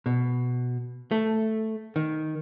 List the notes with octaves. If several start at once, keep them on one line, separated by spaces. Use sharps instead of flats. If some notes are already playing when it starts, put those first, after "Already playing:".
B2
A3
D#3